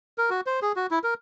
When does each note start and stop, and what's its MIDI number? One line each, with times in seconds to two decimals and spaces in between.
0.18 0.30 70
0.30 0.41 66
0.47 0.60 72
0.62 0.72 68
0.76 0.87 66
0.91 0.99 64
1.04 1.14 70